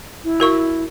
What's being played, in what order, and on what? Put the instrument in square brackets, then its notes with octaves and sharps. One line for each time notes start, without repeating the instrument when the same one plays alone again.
[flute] E4
[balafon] F#4 A#4 C#6